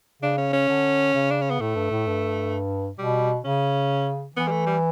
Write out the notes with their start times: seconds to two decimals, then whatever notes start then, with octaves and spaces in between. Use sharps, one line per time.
0.22 C#3 D4
0.38 C#4
0.53 C#4
0.69 D3
1.14 C#3
1.31 D4
1.42 C#4
1.50 B3
1.60 A2 A3
1.76 G2
1.91 A2
2.07 G2
2.98 B2 G3
3.44 C#3 C#4
4.36 E3 B3
4.48 G3
4.51 A3
4.66 G3